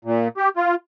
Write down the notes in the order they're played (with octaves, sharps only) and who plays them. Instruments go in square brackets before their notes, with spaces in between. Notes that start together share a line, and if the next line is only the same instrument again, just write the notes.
[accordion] A#2
G4
F4